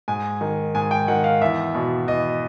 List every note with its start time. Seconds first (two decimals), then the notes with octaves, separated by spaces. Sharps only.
0.08 G#2 G#5
0.41 D#3
0.75 G#2 G#5
0.91 G5
1.08 D#3 F#5
1.24 F5
1.41 E2 E5
1.75 B2
2.08 E2 D#5